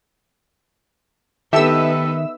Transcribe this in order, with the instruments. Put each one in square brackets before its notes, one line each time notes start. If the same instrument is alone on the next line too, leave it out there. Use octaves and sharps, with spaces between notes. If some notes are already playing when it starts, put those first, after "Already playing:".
[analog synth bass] D#3 [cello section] B3 D#4 B4 [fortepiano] G4 A4 [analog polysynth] E5 E6